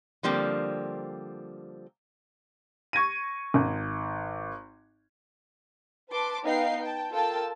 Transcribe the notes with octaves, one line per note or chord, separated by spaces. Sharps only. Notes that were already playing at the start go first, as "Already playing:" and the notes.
D3 F3 G3 A#3 C4
C#6 G#6 A#6 D#7
G#1
B4 A5 C6 D6
B3 D#4 B4 F5 G5 C7
G5 A5
F4 A4 A#4 G5 A5 E6